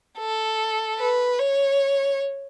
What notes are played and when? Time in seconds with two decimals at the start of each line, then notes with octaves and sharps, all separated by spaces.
0.18 A4
0.99 B4
1.40 C#5